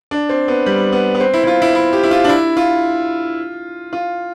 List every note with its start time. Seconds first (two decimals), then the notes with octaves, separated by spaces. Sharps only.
0.11 D4
0.29 C4
0.48 B3
0.66 G3
0.92 B3
1.15 B3
1.20 C4
1.34 E4
1.44 E4
1.47 F4
1.62 E4
1.75 E4
1.93 G4
2.03 E4
2.11 F4
2.24 D4
2.29 E4
2.57 F4
3.93 F4